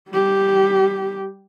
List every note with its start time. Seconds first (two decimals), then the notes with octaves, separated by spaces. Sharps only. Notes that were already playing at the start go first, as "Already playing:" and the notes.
0.10 G3 G4